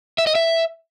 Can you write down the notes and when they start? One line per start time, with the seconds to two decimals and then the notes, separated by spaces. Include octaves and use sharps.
0.18 E5
0.27 D#5
0.35 E5